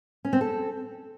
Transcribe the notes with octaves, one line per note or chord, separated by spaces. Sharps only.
C#4
C4
A4